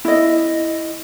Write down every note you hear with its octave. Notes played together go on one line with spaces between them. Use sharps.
E4 D#5